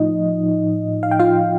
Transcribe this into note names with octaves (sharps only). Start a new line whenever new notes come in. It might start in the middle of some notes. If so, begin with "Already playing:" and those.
Already playing: A2 F3 D#4 D#5
F5
G5
F4 F5